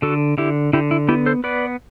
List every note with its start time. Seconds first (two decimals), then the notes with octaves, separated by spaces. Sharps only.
0.02 D3 F#4 A4
0.38 D3 E4 G4
0.73 D3 E4 G4
0.91 E4
1.09 B3 E4 G4
1.26 A4 C5
1.44 B3 B4 D5